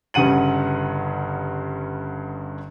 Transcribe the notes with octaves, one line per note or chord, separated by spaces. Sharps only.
G1 G2 C#3 F#5 D#7 F#7